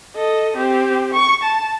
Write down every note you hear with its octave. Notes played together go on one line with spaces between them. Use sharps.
A4 D#5
C4 G4
C#6
A5